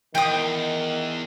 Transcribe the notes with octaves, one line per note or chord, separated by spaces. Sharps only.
E2 D#3 G5 D#6